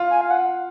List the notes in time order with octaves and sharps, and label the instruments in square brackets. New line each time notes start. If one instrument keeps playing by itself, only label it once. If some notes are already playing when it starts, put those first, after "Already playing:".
Already playing: [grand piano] F4
[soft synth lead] G#5
F5
F#5